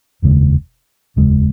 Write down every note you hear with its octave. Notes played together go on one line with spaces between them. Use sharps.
F1 D#2 C#3 G#3
F1 D#2 C#3 G#3